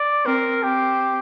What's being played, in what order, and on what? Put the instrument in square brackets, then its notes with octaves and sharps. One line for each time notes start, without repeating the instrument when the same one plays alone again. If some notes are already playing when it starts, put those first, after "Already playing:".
Already playing: [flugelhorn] D5
[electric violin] C4 [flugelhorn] A#4
[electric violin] C4 [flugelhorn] G4